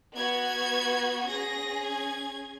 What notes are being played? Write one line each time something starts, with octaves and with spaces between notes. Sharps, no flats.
B3 F#4 G#6
C#4 G#4 A#6
G#6